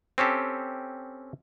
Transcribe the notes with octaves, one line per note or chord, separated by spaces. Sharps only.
C4 C#4 G4 A4